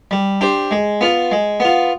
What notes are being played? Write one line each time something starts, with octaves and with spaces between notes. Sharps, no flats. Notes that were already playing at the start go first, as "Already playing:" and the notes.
G3
D4 G4 C5
G#3
B3 F4
G#3
B3 F4